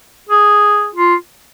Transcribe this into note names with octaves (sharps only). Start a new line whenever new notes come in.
G#4
F4